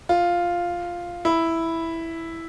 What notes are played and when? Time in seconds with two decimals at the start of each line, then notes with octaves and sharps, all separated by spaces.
0.09 F4
1.25 E4